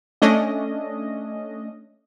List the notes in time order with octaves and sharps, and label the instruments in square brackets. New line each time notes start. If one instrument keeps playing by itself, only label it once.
[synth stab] A3 C#4 D4 D#5